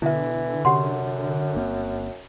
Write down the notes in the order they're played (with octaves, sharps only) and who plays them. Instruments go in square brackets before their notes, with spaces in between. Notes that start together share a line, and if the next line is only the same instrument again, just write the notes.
[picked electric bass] B2 [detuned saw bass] D3 [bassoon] E3 [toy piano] E4 E5
[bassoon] F#2 [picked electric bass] C3 C#4 [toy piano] G4 F#5 C6
[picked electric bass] G1 A#3 C4